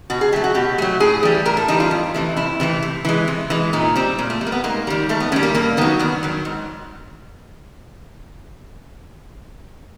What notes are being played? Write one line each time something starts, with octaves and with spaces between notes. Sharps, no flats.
B2 F#4
G#4
F#3 A3 G4
F#4
B2 G4
F#3 A3
A2 G#4
E3 G3
A2 A#4
A4
E3 G3 D#4
F4
F2
C3 E3 A3
F2 E4
C3 E3 A3
C3
E3 G#3
C3
E3 G#3
A#2 D#4
G3 C4
A#2 A#3
A3
G3
A#3
B3
G#2 A#3
D#3 G3
G#2 A3
B3
D#3 G3 C#4
A#3
G2 A#3
D#3 F#3 B3
G2 B3
D#3 F#3
G#2